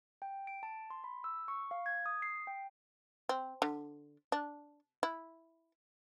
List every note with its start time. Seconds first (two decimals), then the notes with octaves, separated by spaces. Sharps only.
0.22 G5
0.47 D7
0.63 A5
0.90 C6
1.04 B5
1.24 E6
1.48 C#6
1.71 F5
1.86 G#6
2.06 D#6
2.22 C7
2.47 G5
3.29 C4
3.62 D3
4.32 D4
5.03 E4